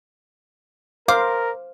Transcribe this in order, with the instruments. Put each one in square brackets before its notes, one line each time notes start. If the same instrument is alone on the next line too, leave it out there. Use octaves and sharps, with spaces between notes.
[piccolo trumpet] A#4 [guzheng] C5 [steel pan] F5 [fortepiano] D6